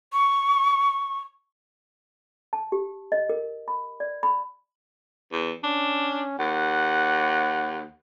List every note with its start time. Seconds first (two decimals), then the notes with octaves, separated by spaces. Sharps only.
0.13 C#6
2.53 A5
2.72 G4
3.12 D#5
3.29 A#4
3.68 B5
4.00 D5
4.23 B5
5.32 E2
5.64 C#4 D4
6.39 D#2 F#5